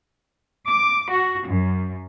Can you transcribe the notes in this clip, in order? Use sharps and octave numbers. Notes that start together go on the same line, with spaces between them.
D6
F#4
F#2